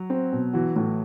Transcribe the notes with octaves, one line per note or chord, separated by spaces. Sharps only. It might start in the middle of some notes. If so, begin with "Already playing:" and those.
Already playing: F#3
C4
B2
E3 F#4
A2 E3